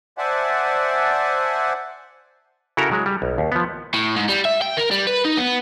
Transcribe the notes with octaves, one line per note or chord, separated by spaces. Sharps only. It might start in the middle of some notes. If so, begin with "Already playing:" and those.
C5 D5 E5 F#5 G#5 A5
C#3 E4 F#4 A4 A#4 A#5
F#3 G#3
G3
B1
D#2
F3 B3
A2
G#2
G3
E5
G5
A#4
G3
B4
D#4
B3